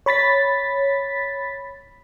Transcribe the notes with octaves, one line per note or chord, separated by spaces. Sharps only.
C#5 B5 A6 B6